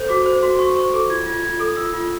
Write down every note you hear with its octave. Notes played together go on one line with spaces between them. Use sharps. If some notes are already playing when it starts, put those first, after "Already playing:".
Already playing: A4 C5 G6
F#4 D6
C5
F#4 C6
F#4 C#6
C5 C#6
A4 D6
F4 G#6
F4 G#6
F4 G#6
A4 D#6
F4 E6
F4